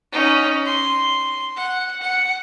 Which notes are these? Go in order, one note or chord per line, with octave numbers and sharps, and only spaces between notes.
C#4 D#4
C6
F#5
F#5